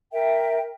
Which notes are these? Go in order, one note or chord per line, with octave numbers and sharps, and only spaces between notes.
A#4 E5 G5